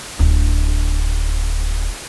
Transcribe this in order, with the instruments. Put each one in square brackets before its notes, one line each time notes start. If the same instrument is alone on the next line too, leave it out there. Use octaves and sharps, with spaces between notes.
[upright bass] D1 D4